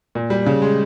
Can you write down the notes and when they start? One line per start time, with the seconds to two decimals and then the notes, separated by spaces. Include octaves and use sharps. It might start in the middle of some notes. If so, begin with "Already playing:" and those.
0.15 A#2
0.30 G3
0.46 C#3
0.62 G#3